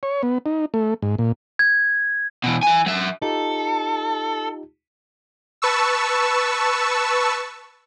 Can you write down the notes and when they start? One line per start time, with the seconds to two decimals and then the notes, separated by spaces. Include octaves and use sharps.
0.03 C#5
0.23 B3
0.46 D#4
0.74 A3
1.02 G#2
1.18 A#2
1.59 G#6
2.44 B2 E3
2.62 E3 G#5
2.86 F#3 E5
3.22 D#4 F4 G4 A4
5.62 B4 A5 C#6 E6